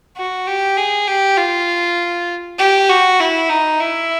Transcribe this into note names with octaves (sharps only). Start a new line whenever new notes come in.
F#4
G4
G#4
G4
F4
G4
F#4
E4
D#4
E4